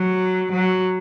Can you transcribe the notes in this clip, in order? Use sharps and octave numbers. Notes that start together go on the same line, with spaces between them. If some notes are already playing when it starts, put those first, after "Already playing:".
Already playing: F#3
F#3